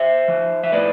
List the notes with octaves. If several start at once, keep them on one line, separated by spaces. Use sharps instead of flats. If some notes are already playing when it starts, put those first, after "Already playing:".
Already playing: C5 E5
F3
E5
A2 B4 D5